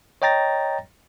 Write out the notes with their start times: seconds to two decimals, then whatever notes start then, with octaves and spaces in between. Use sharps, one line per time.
0.22 C#5 D#5 G5 A#5 A6 A#6